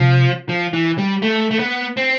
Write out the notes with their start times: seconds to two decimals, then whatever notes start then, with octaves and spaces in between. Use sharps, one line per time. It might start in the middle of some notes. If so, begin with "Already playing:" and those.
Already playing: C3 F3
0.49 F3
0.73 E3
0.98 G3
1.22 A3
1.51 A3
1.59 B3
1.97 C4